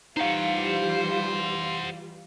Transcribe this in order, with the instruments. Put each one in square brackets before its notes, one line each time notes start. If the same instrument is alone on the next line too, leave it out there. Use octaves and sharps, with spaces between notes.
[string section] E3 G3 F4 [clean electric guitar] D#4 F5 [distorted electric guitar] C5 F#5